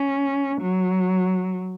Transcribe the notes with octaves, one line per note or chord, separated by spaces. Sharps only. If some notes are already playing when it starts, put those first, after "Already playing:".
Already playing: C#4
F#3